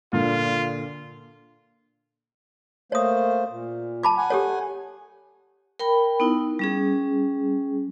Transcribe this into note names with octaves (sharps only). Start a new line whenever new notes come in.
A#2 D3 F4
A3 A#3 C5 C#5 D#6
A#2
A5 B5 D6
F#5 G#5
G4 A4 C#5
A#4 G5 B5
B3 D#4 E4
G3 C#4 G#4